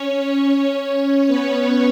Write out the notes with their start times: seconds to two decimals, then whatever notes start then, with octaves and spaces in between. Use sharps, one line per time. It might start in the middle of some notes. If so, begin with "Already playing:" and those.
Already playing: C#4 C#5
0.75 C#4 C#5
1.27 B3 B4